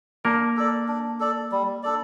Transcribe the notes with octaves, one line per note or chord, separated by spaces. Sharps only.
A#3 D4 A#4
A4 D5
D4
A4 D5
G3
D4 A4 D5